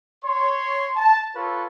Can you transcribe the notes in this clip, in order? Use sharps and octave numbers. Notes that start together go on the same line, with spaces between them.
C#5 C6
A5
F4 A4 B4 C#5